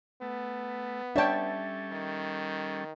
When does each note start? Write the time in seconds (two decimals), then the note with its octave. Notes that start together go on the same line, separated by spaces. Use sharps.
0.22 A3 B3
1.16 G3 C#4 D4 A4 C#5 E5 G5 A5
1.92 D#3